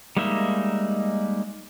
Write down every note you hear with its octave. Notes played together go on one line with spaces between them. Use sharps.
G3 G#3 A#3 D#4 E5